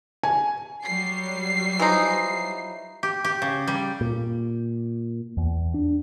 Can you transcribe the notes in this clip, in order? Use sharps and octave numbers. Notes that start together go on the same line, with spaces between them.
G#5
F#3 G3 C7
E3 F3 D#4
G4
G4
C#3
G3
A#2
E2
D4